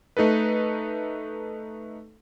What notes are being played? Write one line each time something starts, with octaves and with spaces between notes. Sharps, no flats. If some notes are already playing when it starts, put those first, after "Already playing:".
A3 D#4 A4 B4